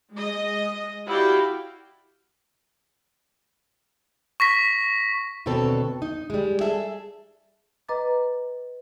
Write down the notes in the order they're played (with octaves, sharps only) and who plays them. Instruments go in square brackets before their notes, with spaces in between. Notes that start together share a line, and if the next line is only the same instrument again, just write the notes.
[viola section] G#3 D#5
E4 F#4 G4 D5 F5 G5
[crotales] C#6 A#6 B6
[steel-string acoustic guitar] D#2 B2 D3 C4 A4 C#5
D#4
G3 G#3
G#4 A4 E5
[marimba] B4 D#5 A#5 D6 A6